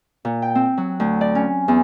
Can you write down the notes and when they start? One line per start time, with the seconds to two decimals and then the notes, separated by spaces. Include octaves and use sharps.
0.25 A#2
0.42 G5
0.55 C4
0.77 F#3
1.00 D2
1.21 D5
1.35 C#4
1.68 E2